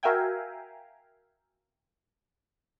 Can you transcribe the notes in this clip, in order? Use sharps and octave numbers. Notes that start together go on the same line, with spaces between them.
F#4 A#4 E5 F5 G5 G#5